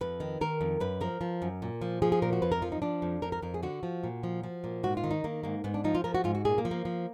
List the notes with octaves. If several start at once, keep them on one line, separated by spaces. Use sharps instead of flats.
F2 B4
D#3
D#3 A#4
F2
F#2 B4
F3 A#4
F3
F#2
A#2
F3
F3 G#4
G#4
A#2 A#4
F#4
F2 B4
A#4
F3 F4
D#4
F3 D4
F2
F2 A#4
A#4
F2 A#4
G#4
D3 F#4
F3
A#2
F3
F3
A#2
G#2 F#4
F4
D#3
D#4
D#3 A#3
G#2 A#3
G#2 B3
D4
F3 D#4
F4
F3 A#4
F#4
G#2 F4
F#4
A#2 G#4
A#3
F3
A#3
F3